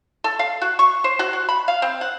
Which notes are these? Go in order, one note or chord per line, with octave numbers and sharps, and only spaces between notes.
A4
F5
F#4
C#6
C5
F#4
F#4
B5
F5
C4
F#5